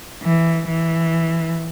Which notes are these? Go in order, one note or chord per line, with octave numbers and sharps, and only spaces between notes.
E3
E3